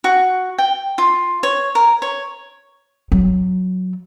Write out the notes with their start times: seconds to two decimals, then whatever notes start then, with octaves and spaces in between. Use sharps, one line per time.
0.04 F#4
0.58 G5
0.98 F4
1.43 C#5
1.75 A#4
2.02 C#5
3.12 F#3